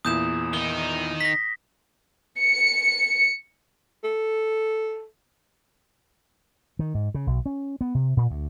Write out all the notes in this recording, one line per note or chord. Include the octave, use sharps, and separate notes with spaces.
E2 A#2 E4 D#6 G6 E7
D#3 D#4 G7
A#6 B6
C#7
A4
D#3
G#2
C#3
B1
C#4
B3
C3
A#2
D2